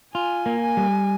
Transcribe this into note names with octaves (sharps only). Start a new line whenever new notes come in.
F4 G#5
A#3
G#5
G3